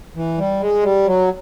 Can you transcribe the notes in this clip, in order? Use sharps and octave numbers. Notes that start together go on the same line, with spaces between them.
E3
G3
G#3
G3
F#3